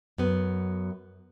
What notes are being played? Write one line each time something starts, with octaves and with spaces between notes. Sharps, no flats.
F#2 B3